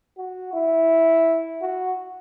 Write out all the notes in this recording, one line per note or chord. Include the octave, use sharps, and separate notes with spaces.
F#4
E4
F#4